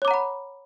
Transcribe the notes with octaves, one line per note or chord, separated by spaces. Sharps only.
C#5 F#5 A#5 B5 D6